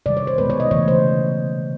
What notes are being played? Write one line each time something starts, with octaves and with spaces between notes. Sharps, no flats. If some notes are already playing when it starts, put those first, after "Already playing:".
C3 D#3 G3 D5
C#5
C5
B2 G#3 B3 B4
C#5
D#5
C#3 E3 A3 C#5
C5